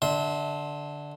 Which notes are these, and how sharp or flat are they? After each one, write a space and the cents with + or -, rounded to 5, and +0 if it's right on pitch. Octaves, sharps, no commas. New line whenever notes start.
D3 +0 E5 -25 C6 +5